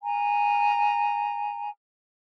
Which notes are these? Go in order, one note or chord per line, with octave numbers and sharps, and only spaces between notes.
G#5 A#5